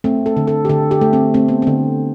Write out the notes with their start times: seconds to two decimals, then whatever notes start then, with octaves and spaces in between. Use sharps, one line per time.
0.04 A3 C4
0.26 A4
0.37 D3
0.47 A4
0.65 G4
0.69 D3 A4
0.91 G4
1.01 A3
1.13 C4
1.34 A3 C4
1.48 B3
1.62 D3 C4